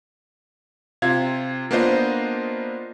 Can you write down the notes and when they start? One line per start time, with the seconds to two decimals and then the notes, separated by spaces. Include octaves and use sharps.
1.02 C3 F4 F5 G#6
1.71 A#3 B3 D4 F4 C5 D#5